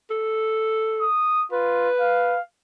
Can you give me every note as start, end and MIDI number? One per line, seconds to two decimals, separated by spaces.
0.10 1.05 69
1.01 1.44 87
1.52 1.89 65
1.52 2.36 71
2.00 2.41 77